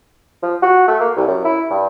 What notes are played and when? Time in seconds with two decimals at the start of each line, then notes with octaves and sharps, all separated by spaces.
0.43 F3
0.62 F#4
0.88 A3
1.00 A#3
1.16 C2
1.28 F#2
1.44 E4
1.70 G2